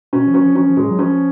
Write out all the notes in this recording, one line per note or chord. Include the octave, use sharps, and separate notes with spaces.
B2 C#4
F3
C#4
F3
F3 C#4
F3
A2 G#3
F#3
F3 C#4